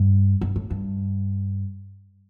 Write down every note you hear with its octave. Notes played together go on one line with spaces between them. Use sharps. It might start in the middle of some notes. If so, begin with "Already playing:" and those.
Already playing: G2
G2
A2
G2